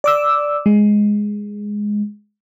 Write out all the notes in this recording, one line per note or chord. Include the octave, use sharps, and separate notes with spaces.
D5 D6 E6
G#3